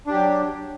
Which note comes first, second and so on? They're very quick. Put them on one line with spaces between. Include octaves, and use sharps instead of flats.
D4 G4 F#3